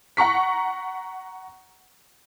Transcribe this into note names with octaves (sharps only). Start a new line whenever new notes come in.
F#5 A#5 C#6 B6